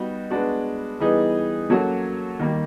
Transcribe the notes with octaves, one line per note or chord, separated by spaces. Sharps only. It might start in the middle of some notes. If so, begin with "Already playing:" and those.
Already playing: G3 B3 D#4 F#4
G#3 B3 D4 F#4
E3 G3 B3 D#4 G#4
F#3 A#3 C#4 F#4 A4
D#3 G3 A#3